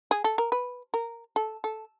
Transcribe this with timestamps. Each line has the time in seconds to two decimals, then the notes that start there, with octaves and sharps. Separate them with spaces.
0.11 G#4
0.24 A4
0.38 A#4
0.52 B4
0.94 A#4
1.36 A4
1.64 A4